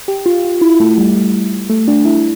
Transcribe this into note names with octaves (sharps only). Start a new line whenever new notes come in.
G4
F4
F4
E4
A3
G3
G3
A3
D4
E4